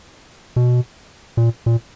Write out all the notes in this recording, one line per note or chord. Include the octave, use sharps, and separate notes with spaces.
B2
A#2
A#2